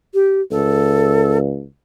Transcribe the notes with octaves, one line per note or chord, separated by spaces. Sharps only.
G4
C#2 A4